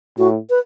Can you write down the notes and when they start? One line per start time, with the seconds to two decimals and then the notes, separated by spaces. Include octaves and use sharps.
0.18 A2 F#4
0.50 B4